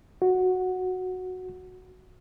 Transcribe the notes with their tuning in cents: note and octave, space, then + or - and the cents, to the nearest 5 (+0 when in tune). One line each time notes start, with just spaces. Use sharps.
F#4 -5